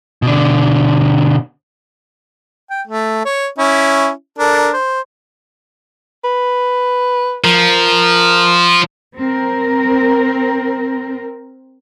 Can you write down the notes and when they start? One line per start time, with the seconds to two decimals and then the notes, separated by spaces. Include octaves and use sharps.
0.22 B2 D3
2.71 G5
2.88 A3
3.26 C#5
3.58 C#4 E4
4.38 D4 A4 A#4
4.74 C5
6.24 B4
7.44 F3 A#4
9.18 C4 A#4